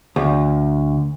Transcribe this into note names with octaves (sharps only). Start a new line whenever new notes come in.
D2